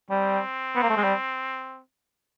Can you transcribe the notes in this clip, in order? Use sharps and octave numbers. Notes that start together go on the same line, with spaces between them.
G3 C4
B3
A#3
A3
G#3
G3